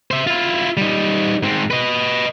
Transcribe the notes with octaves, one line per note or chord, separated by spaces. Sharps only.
C5 E5
E4 F4
G3 D#4
G#2 C4
B4 D#5